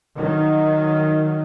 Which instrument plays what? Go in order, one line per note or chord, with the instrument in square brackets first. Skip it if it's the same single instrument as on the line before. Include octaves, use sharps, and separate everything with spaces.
[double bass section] D#3 F#3